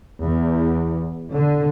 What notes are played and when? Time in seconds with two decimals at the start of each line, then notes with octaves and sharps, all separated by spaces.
0.23 E2
1.33 D3